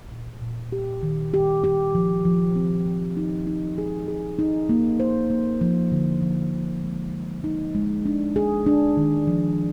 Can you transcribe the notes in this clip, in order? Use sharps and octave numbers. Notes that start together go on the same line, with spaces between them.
A#2
A#2
G4
D#3
G4
G4
F3
F3
C4
F3
D#4
D#4
G#4
G#4
D#4
A#3
C5
A#3
F3
D3
F3
D3
G#3
G#3
D#4
G#3
D4
G#4
D4
D#3
F3